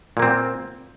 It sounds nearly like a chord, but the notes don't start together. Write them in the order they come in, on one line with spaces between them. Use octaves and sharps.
A#2 A#3 C4